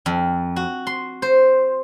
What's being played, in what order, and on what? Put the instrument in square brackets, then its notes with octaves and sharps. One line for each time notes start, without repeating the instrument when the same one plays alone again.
[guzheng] F2
F#4
C6
C5